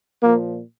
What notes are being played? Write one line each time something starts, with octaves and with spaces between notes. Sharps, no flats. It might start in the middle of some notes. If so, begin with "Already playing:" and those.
A#2 F3 A#3